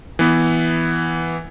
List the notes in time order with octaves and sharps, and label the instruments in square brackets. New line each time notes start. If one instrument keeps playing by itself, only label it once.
[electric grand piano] E3 B3